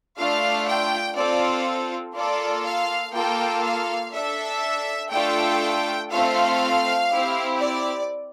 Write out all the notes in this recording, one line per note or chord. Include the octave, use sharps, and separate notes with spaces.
A3 D4 F4 F5
G5
C4 F4 A4 D5
A#3 F4 A4 D5
F5
A#3 F4 A4 G5
F5
D4 A4 E5
A3 D4 F4 A4 G5
A3 C4 F4 A4 F5
C4 E4 G4
D5